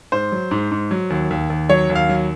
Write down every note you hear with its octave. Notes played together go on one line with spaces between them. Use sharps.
G#2 C5
F#3
G#2
G#2
F#3
D#2
D#2
D#2
F#3 C#5
D#2
F5
F#3